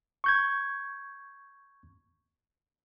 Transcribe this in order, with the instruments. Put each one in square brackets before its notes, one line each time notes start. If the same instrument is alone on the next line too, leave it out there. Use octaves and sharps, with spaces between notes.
[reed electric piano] C#6 G6 G#6